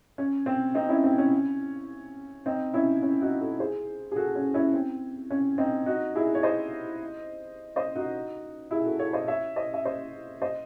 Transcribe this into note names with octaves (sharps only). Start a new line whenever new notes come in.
C#4
C4
C4 D#4
C#4 E4
C4
C#4
C4 D#4
C#4 E4
C#4
D#4 F#4
F#4 A4
G#4 C5
G#4
F#4 A4
C#4
C#4 E4
C4
C#4
C4 D#4
D#4 F#4
E4 G#4
C#5
C5 D#5
C5 D#5
D#4 F#4
E4 G#4
F#4 A4
A4 C#5
C5 D#5
C#5 E5
C5 D#5
E5
C5 D#5
C5 D#5